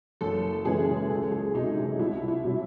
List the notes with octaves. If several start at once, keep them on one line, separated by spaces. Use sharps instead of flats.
F#1 A4
F#2 C#3 E3 G#3 G#4
C#2 A4
G#4
C3 F#3 D#4
D#4
C2 E4
E4
C3 F#3